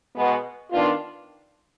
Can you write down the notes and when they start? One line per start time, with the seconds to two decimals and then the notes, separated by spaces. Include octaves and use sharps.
0.15 B2 G#3 B3
0.72 D#3 B3 D4 F4